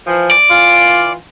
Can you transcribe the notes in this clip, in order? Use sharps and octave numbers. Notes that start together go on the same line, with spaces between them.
E3 F3
D5
E3 F4